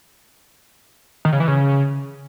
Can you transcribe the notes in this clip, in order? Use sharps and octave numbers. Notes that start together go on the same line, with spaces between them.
D#3
C#3
E3
C#3